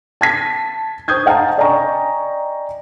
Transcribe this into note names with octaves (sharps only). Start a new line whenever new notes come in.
A5 G#6 B6
C5 C#6 D#6 G6 G#6
D#5 F5 F#5 A5 A#5
D5 D#5 G5 G#5 A#5 C#6